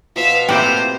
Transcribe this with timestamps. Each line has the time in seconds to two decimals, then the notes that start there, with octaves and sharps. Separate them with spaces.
0.16 B2 F3 E5 F5
0.48 A2 A#3 C4 G4 C5 E5 G5 A#5